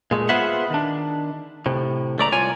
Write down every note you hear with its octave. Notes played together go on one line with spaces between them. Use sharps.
A#2 G#3 A3
B3 F4 G#4 C5 E5 F#5
D#3 D4
A2 C3
C#2 A3 D5 A#5
C2 F4 C#5 G#5